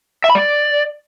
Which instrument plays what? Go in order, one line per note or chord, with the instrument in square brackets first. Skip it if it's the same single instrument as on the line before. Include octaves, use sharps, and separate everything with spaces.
[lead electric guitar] E5
B5
D5